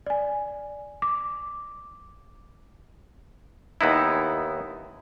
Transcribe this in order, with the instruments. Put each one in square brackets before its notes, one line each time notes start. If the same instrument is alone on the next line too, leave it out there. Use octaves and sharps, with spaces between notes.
[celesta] D5 G#5
D6
[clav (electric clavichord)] D#2 B3 D#4 E4